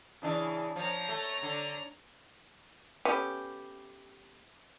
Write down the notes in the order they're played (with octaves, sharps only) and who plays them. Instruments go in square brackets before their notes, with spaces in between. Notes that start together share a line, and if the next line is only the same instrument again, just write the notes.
[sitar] C#3 E3 D4
[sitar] F3 [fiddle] C#5 A#5
[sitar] A3
D3
[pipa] A3 B3 C#4 G4